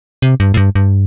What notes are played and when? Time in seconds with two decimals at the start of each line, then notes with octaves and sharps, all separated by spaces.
0.22 C3
0.40 G2
0.54 A2
0.57 G2
0.75 G2